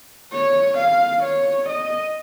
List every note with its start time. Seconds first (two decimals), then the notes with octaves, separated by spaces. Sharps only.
0.32 C#5
0.78 F5
1.23 C#5
1.69 D#5